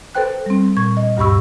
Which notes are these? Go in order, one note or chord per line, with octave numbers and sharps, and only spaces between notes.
A4 B4 C5 G5 F#6
G3 C4
A#2 C#6 G#6
D#5
D2 G2 G4 B5 C#6 E6